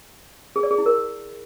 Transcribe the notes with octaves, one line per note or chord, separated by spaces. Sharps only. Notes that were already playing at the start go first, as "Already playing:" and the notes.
G#4
D5
G#4
E4
A#4